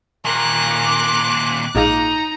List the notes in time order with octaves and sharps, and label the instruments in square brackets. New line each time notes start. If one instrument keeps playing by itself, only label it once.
[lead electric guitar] D#2 A#2 [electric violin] A#4 [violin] D6 F#6
[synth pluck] A#1 G#2 F5 [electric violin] D#4 A#5